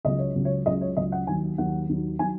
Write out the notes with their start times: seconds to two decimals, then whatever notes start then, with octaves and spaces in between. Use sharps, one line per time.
0.05 C#2 C#3 F#3 D#5
0.18 C#5
0.35 C#2 C#3 F#3
0.45 C#5
0.66 C#2 C#3 F#3 D#5
0.81 C#5
0.97 C#2 C#3 F#3 D#5
1.12 F#5
1.27 D#2 D#3 F#3 G#5
1.58 D#2 D#3 F#3 F#5
1.89 D#2 D#3 F#3
2.19 D#3 F#3 G#5